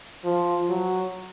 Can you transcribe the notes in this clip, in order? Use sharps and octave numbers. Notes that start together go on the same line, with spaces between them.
F3
F#3